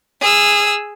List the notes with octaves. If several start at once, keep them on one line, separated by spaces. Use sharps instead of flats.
G#4 E6